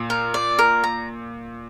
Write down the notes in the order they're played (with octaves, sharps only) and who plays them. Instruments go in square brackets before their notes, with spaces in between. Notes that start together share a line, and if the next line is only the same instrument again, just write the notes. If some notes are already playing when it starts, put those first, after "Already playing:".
Already playing: [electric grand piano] A#2
[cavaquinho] A#4
D5
A#4
A#5